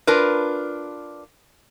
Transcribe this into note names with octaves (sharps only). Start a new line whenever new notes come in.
D4 F4 A#4 B4